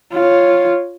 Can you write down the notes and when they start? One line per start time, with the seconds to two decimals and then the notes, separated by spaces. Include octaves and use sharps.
0.13 F4 C#5